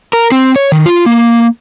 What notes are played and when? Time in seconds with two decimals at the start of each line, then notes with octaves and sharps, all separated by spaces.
0.13 A#4
0.32 C4
0.56 C#5
0.72 D#3
0.86 F4
1.06 A#3